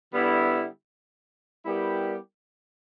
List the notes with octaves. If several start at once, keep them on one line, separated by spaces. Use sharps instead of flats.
D3 G3 B3 E4
G3 B3 E4 G4 A#4